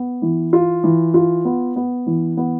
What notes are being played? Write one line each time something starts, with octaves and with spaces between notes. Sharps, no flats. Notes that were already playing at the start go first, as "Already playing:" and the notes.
Already playing: B3
E3
F4
E3
F4
B3
B3
E3
B3